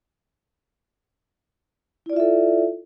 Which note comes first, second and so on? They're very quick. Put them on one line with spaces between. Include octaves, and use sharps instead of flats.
E4 D5 F4 E5 A4